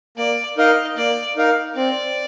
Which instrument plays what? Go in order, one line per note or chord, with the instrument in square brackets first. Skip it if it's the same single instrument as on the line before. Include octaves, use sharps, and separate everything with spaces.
[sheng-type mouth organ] A#3 [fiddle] D5
[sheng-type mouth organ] D#4 A#4 F5 [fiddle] D#5
[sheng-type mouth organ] A#3 [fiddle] D5
[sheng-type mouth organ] D#4 A#4 F5
[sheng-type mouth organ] C4 [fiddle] D5